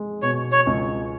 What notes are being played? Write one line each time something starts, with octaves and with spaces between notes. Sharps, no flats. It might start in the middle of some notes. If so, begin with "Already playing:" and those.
Already playing: G#3
B2 C#5
C#5
C#2